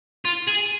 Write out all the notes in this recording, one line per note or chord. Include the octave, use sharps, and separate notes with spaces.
F4
G#4